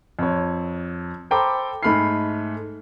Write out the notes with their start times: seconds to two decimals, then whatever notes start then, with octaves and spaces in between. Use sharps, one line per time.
0.19 F2 C#5
1.31 A4 C5 G5 A#5 B5 D6
1.83 G#2 A3 B5 F6 C7